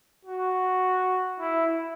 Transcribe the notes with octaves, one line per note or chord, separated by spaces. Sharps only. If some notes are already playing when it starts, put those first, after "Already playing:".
F#4
E4